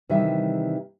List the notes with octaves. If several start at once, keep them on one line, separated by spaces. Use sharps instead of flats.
C3 D#3 E3 G3 D4 E5